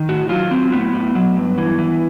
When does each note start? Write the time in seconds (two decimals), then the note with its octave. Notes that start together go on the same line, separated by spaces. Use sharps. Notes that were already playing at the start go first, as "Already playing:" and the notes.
Already playing: D#3
0.09 A2 F#4
0.29 F#3 F4
0.51 F#3 C4
0.72 A2 B3
0.93 A2
1.15 F#3
1.36 G2
1.58 E3
1.79 E3